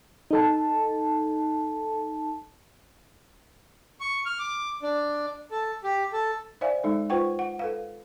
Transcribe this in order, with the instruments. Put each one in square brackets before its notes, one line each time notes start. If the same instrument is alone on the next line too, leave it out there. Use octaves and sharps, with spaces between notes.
[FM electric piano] D#4 A4 A5
[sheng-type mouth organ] C#6
F6
D6
D4
A4
G4
A4
[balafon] C5 D5 E5 F5 G#5
G#3 D#4 A4
F4 B4 C5 F#5 G5 C#6
F#5
A4 B4 F5